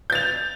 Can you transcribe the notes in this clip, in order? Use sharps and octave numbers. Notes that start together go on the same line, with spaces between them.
G6 A6 F7